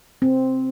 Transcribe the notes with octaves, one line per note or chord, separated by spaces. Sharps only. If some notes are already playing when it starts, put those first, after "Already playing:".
C4